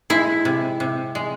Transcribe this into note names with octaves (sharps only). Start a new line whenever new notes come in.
G#3 E4
C3
C3
G#3